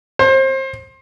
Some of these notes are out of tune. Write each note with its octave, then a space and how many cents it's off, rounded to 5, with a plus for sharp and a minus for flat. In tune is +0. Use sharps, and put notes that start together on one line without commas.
C5 +30